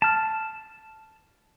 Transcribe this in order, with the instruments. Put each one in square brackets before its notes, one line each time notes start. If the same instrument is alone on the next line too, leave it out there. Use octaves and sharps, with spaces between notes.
[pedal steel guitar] A5 F6